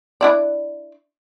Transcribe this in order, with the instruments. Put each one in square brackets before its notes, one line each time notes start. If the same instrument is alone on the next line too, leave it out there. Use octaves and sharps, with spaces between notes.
[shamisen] D4 E4 D5